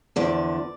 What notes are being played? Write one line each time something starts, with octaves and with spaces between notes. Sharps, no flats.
E2 D3 F3 D5